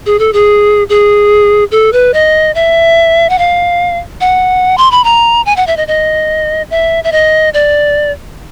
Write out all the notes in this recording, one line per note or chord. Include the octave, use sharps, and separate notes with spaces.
G#4
A4
G#4
G#4
A4
B4
D#5
E5
F#5
F5
F#5
C6
B5
A#5
G#5
F#5
E5
D#5
D#5
E5
E5
D#5
D5